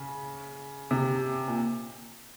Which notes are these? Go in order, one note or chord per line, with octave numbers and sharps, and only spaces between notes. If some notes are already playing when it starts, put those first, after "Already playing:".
Already playing: C#3
C3
A#2